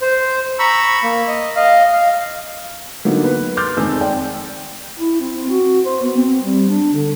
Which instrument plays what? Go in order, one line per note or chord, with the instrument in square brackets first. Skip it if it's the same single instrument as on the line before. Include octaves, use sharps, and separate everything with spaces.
[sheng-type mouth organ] C5
A#5 B5 C#6 E6
A#3
D#5
D#5 F5
F5
[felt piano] D3 F#3 A#3 B3 D#4
B4
C6 D6 F6 G6 A6
F1 D#3 G#3 C4 E6
D5 G5
[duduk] E4
C4
C4
F#4
C5
B3
C4
G3
D4
D3